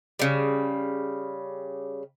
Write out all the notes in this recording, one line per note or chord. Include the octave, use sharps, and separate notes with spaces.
C#3 G3